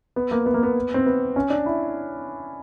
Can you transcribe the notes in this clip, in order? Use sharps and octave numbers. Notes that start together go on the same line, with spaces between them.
B3
A#3
B3
A#3
B3
C4
B3
C#4
D4
E4